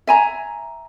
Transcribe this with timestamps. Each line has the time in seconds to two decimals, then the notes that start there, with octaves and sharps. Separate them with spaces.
0.07 E5 G#5 A#5